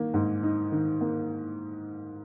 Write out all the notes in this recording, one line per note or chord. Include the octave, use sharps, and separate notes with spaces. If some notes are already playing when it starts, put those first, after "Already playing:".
Already playing: D#3 A#3
G#2
D#4
D#3
A#3